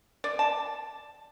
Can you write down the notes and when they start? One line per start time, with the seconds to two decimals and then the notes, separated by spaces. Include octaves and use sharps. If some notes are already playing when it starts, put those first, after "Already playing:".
0.24 D5
0.39 A5